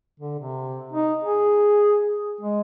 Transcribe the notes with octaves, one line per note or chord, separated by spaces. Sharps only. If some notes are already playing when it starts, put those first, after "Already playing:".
D3
C3
D#4
G#4
G#3